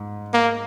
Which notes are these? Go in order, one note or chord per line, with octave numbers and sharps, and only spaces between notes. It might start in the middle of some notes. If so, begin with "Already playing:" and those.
Already playing: G#2
A#3